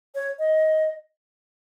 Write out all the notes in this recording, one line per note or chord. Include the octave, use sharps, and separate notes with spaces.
C#5
D#5